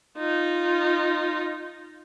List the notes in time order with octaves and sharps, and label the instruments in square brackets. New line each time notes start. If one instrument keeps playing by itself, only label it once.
[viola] D#4 F4